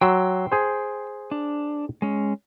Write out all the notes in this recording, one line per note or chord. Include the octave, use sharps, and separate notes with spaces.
F#3 G5 C6 E6
G#4 C5
D4
G#3 C#4